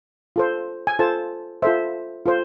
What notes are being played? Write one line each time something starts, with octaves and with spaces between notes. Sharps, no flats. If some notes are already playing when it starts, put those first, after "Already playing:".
F4 A4 C5
G#5
F4 A4 C5 A5
F4 A4 C5 E5
F4 A4 C5